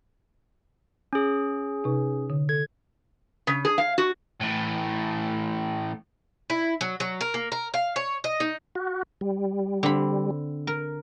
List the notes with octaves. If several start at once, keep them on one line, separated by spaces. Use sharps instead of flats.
C#4 G#4
C3 D#4
D3
A4 G#6
C#3
G#4
F5
F#4
A2 E3
E4
F#3
F#3
A#4
A#3
A#4
F5
C#5
D#5
D#4
F#4
G3
D3 C4 B5
A#4